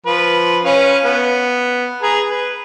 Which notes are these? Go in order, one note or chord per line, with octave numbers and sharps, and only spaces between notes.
F3 B4
C#4 B4 F5
B3
G#4 B4 A#5
B4